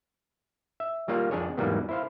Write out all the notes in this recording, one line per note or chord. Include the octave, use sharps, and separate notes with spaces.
E5
G3 A#3 F4 C#5 F5
F2 D4 G#4 C#5
E2 G#2 F#3 G3 A#3 B3
E4 C5 F5